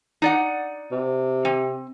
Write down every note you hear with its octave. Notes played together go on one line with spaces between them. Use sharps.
D#4 D5 F#5
C3
C4